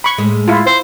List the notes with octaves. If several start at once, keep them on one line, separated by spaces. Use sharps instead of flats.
B5 C#6
A2 G#3
E4 F4
C5